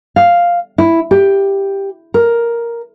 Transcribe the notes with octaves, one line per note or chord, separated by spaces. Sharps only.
F5
E4
G4
A#4